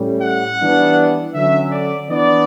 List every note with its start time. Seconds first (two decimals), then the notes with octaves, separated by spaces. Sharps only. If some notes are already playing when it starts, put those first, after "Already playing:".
Already playing: A2 G3 C#4
0.22 F#5
0.60 E3 G3 B3 D4
1.35 D3 F#3 C#4 E5
1.72 D5
2.09 E3 B3 D4 D5